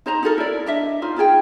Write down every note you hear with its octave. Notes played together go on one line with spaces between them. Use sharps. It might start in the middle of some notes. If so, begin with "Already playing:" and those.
D#4 C5 D#5 A#5
D#4 F#4 A4 A#4
E4 D5
D4 D#5 E5
D#4 F4 C5
D#4 F4 G#4 G5